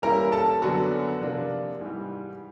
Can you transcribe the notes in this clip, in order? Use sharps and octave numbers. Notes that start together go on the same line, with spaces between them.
E3 G3 A#3 C#4 E4 A#4 A#5
A4 A5
F#2 D3 F#3 B3 D4 F#4 F#5
C3 F3 A#3 D4 F4
G#2 E3 G3